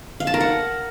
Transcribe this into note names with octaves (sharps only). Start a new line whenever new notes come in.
F5
A5
A#4
F#5